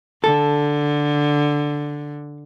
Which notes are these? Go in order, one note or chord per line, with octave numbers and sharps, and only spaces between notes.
D3 A4